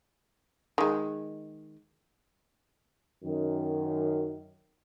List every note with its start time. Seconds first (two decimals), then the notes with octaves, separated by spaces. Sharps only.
0.78 D#3 G#3
3.23 F#2 D#3